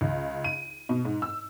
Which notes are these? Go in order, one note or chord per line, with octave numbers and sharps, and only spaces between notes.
C#2
D#7
B2
G#2
E6